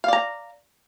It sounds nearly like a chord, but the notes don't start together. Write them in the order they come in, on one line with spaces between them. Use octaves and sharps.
F5 D5 A#5